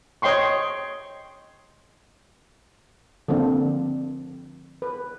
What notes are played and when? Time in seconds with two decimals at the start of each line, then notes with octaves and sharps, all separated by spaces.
0.22 C#5 D#5 G5 C6 C#6
3.28 D3 F3 A#3 C4 D4
4.82 B4